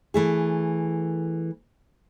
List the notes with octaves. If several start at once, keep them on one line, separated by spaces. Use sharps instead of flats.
E3 A3 G#4